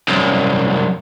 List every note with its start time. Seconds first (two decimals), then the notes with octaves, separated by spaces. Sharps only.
0.08 C2 F#2